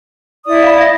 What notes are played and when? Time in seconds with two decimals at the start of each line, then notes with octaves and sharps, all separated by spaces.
0.46 E4 D5 D#6
0.63 F5 B5
0.78 E5 A#6